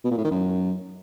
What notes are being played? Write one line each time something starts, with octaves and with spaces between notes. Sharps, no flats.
B2
A#2
A2
D#3
F#2